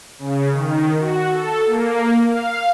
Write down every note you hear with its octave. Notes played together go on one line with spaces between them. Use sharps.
C#3
D#3
F#4
A4
A#3
F5